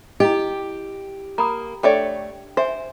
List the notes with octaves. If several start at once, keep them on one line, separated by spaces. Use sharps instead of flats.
E4 G4 D#5
A#3 A#5 B5 D#6
A3 D4 C#5 D5 E5 G5
C5 E5 G#5